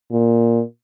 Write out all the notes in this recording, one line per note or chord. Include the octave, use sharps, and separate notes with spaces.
A#2